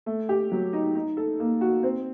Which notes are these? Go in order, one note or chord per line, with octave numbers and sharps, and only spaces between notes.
A3
G4
F#3
D#4
D#4
A4
A#3
F#4
C4